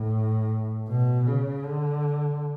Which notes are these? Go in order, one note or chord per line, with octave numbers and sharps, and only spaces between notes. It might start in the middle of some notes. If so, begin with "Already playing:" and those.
Already playing: A2
B2
C#3
D3